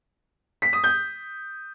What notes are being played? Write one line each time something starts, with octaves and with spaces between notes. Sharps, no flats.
B6
D#6
G6